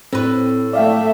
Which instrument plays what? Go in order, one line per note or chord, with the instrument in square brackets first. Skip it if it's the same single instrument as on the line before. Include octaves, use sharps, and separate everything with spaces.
[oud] A2 B4 [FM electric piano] C4
[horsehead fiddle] A3 E5 [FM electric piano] D5 F5 G5